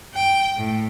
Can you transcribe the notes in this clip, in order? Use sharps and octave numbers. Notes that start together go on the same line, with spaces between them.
G5
A2